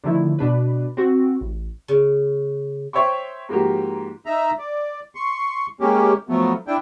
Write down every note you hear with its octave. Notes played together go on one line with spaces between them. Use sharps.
D3 D#3 F3 A3 E4
B2 D4 B4
C4 F#4
A1
C#3
C5 C#5 E5 G5 C#6
G#2 F3 A#3 F#4 G4
D#4 E5 A#5
D5
C6 C#6
G#3 A#3 C#4 G4
F3 F#3 A3 B3
D4 E4 G5